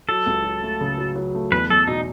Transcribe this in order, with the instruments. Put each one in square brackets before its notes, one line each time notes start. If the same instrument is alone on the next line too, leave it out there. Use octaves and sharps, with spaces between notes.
[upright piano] F#3 [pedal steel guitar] A4
[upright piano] C#2
F#3
A3
C#3
F#3
F#3
A3
[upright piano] E2 [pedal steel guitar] B4
[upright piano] E2 [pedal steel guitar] A4
[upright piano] B2 [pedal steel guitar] D#4